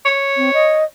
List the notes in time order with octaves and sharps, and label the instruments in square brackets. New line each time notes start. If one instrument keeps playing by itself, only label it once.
[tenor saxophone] C#5
[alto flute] C4
D#5